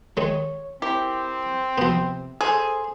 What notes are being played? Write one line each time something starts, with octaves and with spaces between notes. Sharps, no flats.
D#3 G#3 C#5
C4 E4 G4 A#4
C3 F3 B3
G#4 A4 C5